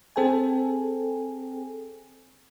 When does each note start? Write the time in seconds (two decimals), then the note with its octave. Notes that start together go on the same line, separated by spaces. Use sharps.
0.16 C4 G#4 A4 C5 G5 G#5